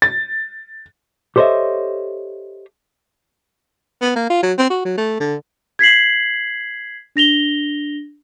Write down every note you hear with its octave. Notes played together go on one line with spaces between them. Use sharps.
A6
G4 A4 C5 C#5 D#5 E5
B3
A#3
F4
F#3
C4
F#4
F#3
A3
D3
G#6 B6 C7 F#7
D4 A#6 F7 G7